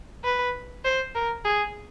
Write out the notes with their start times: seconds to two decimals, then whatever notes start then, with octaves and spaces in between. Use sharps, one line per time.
0.24 B4
0.85 C5
1.15 A#4
1.45 G#4